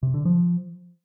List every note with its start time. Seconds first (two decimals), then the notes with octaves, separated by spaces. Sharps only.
0.03 C3
0.14 D3
0.25 F3